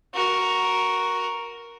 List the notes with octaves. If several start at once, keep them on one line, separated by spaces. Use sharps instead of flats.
F#4 A#4